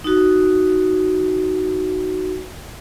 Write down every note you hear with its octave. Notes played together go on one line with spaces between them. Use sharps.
D#4 F#4